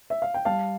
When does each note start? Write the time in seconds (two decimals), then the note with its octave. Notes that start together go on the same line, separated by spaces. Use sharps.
0.10 E5
0.22 F5
0.34 G5
0.45 G3 F5 A5